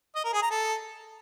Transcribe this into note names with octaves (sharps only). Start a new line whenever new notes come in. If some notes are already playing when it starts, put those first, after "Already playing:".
D#5
A#4
G#4
A#5
A4